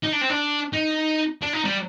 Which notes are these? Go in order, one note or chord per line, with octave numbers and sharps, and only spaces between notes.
D#4
D4
C4
D4
D#4
D4
D#4
G3